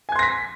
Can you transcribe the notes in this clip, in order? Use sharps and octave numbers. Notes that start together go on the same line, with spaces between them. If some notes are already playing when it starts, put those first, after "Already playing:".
G#5 C6 G#6 A#6 B6